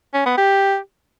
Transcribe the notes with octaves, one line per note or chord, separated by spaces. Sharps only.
C#4
B3
G4